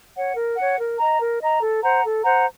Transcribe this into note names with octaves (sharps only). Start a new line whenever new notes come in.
C#5 F#5
A#4
C#5 F#5
A#4
D#5 A#5
A#4
D#5 A#5
A4
C5 F#5 A#5
A4
C5 F#5 A#5